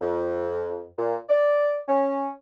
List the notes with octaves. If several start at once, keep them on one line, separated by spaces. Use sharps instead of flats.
F2
A#2
D5
C#4